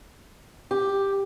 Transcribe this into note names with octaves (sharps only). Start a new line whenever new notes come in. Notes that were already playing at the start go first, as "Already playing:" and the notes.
G4